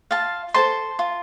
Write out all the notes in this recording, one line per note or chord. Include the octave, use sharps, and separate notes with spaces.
F4 F5 A5
A4 C5 A5 C6
F4